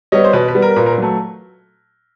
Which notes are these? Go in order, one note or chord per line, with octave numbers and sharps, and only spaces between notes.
G3 B3 C#5 D#5
C5
B2 B4
B4
G3 B3
A#4
A#2 B4
A#4
B4
F#3 A3